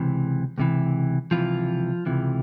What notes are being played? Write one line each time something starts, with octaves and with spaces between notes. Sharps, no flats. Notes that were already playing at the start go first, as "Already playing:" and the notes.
Already playing: C#2 C3 E3
C#2 C3 E3
C#2 C3 E3 F3 F4
C#2 C3 E3